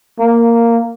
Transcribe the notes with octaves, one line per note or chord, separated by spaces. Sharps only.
A#3